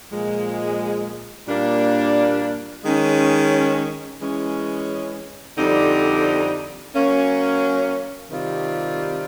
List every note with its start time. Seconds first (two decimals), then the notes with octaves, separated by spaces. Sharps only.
0.10 A#2 F3 G#3
1.47 A#2 G3 A#3 D4
2.84 D#3 G#3 C#4
4.20 E3 G#3 C#4
5.57 F2 D3 G3 C4 D#4
6.94 F#3 A#3 C#4
8.30 C3 D#3 G3 C4 F4